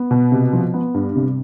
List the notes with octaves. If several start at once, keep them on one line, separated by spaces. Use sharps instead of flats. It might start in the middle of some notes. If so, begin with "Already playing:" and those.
Already playing: B3
B2
C3
F3
B3
G2
C3